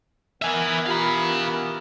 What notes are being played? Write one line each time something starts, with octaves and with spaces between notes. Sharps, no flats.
E3 B3 A#4 E5 G#5
F4 G4 F5 A#5 B5